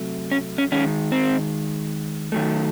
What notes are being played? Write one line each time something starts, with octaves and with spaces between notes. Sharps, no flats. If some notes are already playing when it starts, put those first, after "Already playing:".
Already playing: C3 F#3 A3
C#4
C#4
D#3 G#3 C#4
C4
D#3 F#3 A3